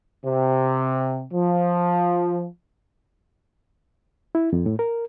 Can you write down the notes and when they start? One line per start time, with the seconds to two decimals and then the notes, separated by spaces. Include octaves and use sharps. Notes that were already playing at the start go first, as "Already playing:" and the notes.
0.25 C3
1.33 F3
4.35 E4
4.53 F2
4.66 A2
4.79 A#4